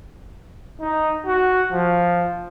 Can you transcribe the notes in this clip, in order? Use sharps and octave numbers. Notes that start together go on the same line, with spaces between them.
D#4
F#4
F3